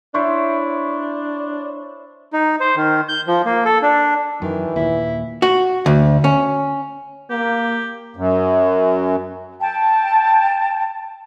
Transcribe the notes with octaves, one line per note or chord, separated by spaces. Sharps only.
D4 E4 C5 C#5
D#4
C5
D#3
G6
F3
A#3
A4
D4
F#2 D#3 E3
D#2 A#2 E4
F#4
D2
C#4
A#3 G4
F#2
G5 A5